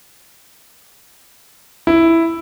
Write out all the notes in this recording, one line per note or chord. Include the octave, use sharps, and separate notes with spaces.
E4